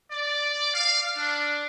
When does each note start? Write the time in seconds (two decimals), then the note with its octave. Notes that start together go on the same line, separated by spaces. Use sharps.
0.12 D5
0.74 F5
1.17 D4